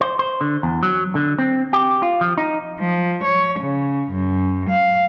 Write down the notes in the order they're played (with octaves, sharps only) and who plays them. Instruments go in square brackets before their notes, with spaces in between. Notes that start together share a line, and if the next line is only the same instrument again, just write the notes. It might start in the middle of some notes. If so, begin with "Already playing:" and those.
[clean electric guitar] C5
C5
D3
E2
F#3
D3
C4
G4
F4
F3
D#4
[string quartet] F3
C#5
C#3
F#2
F5